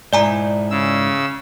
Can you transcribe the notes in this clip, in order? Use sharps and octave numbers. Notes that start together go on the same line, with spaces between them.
G#2 E4 D5 G#5 A#5
C#3 E6